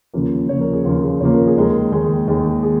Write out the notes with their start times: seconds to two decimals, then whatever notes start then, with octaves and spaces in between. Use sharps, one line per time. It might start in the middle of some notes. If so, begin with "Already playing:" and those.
0.14 D#2 C#3 F3 A#3
0.49 D#2 C#3 F3 A#3 C#5
0.61 A#4
0.73 G#4
0.85 D#2 C#3 F3 A#3 F4
1.02 G#4
1.20 D#2 C#3 F3 A#3 C#5
1.34 A#4
1.47 G#4
1.56 D#2 D#3 G#3 A#4
1.92 D#2 D#3 G#3 G#4
2.27 D#2 D#3 G#3
2.63 G#4